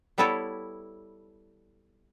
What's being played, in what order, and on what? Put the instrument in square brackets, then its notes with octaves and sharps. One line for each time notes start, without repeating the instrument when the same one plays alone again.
[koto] G3 B3 E4 A4 B4 C#5